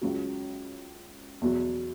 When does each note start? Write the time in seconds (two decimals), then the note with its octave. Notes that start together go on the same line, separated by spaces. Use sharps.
0.01 C#2 C#3 F#3
1.41 E2 B2 F#3